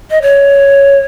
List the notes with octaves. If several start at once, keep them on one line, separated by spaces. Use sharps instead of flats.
D#5
C#5